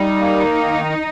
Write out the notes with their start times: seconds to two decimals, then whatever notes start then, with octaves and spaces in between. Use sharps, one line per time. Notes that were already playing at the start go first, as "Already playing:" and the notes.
Already playing: G3 D#4
0.20 A#3
0.59 D#3